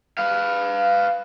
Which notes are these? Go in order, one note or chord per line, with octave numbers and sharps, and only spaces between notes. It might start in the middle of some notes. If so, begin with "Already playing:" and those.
B4 F5